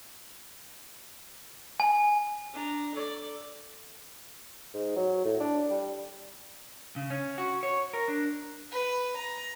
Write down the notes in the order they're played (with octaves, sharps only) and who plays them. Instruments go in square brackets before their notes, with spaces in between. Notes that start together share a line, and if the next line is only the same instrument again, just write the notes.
[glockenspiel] G#5
[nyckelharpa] D4 A#5
A4 D5
[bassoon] G#2
F#3
A2
D4
G3
[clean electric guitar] C#3
C#4
F#4
C#5
A#4
D4
[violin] B4
A#5